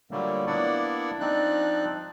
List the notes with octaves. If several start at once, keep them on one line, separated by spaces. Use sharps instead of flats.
A#2 D3 F#3 G3 A3 A#3
A#3 B3 D4 E4 D5 F#5
F3 C4 D4 D#4 D5 F#6